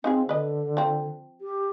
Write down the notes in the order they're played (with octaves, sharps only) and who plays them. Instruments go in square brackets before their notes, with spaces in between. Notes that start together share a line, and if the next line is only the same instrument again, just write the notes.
[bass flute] C4 [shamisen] D#4 F4 G#4
[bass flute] D3 [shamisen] B4 D#5
[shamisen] F3 C4
[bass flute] G4